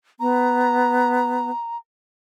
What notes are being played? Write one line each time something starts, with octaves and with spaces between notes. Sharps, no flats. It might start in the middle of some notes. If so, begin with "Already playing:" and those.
B3 A#5